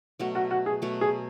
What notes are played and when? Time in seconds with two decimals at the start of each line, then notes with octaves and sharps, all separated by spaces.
0.20 B2 F#3 A3 F#4
0.35 F#4
0.51 F#4
0.66 G#4
0.82 B2 F#3 A3
1.01 G#4